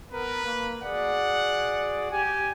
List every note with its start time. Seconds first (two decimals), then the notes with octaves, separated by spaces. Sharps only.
0.12 B3 A#4 B4
0.45 A#3
0.82 F#4 G#4 D5 F#5
2.11 G4 G#5